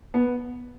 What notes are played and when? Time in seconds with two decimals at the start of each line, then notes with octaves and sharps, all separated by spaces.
0.14 B3